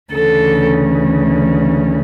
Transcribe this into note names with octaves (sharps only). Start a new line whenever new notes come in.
D2 C#3 E3 A4